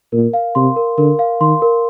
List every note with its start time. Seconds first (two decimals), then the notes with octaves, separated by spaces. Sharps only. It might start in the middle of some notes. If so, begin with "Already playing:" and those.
0.12 A#2 A#4
0.34 F5
0.55 C3 C6
0.76 A#4
0.98 D3 A#4
1.19 F5
1.41 D#3 C6
1.62 A#4